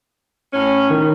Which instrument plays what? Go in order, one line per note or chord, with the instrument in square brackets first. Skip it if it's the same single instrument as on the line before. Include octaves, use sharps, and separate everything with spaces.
[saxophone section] A2 C#4
[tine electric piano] D#3